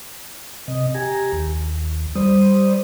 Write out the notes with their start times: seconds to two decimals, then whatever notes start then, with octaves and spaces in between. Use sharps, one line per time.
0.68 C3 D#5
0.95 G4 G#5 A#5
1.32 D#2
2.15 G3 C5 D#6